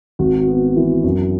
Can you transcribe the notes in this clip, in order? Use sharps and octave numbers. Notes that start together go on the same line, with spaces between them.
G#1 F#4
B3
E3
F#2